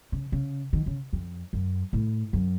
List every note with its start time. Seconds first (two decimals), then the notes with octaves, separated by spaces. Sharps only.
0.12 C#3
0.32 C#3
0.73 D#3
0.86 C#3
1.13 F2
1.53 F#2
1.93 A2
2.33 F#2